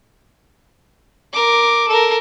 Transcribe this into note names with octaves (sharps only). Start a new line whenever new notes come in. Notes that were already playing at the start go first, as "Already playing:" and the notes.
A#4 D6
A4 A#4